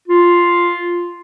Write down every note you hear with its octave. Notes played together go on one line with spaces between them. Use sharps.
F4